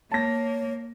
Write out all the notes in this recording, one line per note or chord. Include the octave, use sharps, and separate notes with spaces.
A#3 C#5 A5 A#6